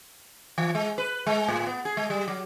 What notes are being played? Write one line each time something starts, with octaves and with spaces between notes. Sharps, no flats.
E3
G#3
B4
G#3
A2
B3
G#4
G#3
G3
F#3